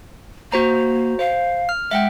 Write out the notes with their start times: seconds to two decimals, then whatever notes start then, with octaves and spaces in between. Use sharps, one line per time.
0.52 A#3 F#4 C5 A#5
1.19 C5 F5
1.69 F6
1.91 G#3 E5 F#5 G5